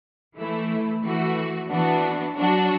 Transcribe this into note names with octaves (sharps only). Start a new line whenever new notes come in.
E3 A3 E4
E3 A3 F#4
E3 B3 D4 F#4
F#3 D4 F#4